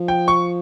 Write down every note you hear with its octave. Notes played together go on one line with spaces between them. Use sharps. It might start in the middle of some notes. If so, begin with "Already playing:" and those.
Already playing: F3
G5
C#6